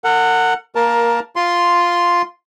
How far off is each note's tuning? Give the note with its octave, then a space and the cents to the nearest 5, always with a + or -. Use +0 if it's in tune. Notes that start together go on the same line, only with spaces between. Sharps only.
A#4 -40 F#5 +0
A#3 +0 A#4 +15 A5 +5
F4 +0 C6 +0